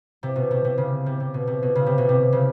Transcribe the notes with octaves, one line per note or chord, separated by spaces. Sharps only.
C3
B2
C3
C3
C#3
C3
C3
B2
C3
B2
C#3
C3
B2
C3
C#3